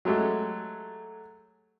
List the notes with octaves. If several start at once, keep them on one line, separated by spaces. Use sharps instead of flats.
F#3 G#3 A3 G4